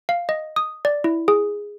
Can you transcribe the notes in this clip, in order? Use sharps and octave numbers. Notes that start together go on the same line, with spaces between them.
F5
D#5
D#6
D5
E4
G#4